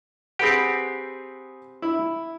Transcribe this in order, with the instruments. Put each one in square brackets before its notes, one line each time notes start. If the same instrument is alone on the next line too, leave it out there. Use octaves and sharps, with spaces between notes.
[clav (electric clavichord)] C4 G4 [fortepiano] G#4 B4 F#5
[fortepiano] E4